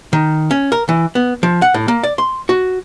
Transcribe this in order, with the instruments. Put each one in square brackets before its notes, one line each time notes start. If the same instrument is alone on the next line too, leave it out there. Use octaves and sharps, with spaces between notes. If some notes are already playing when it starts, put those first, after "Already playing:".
[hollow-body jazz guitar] D#3
C#4
A#4
E3
B3
F3
F#5
A2
A#3
D5
C6
F#4